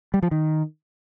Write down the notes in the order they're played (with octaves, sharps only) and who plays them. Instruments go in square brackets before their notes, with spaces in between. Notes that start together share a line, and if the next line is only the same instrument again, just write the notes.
[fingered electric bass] G3
F3
D#3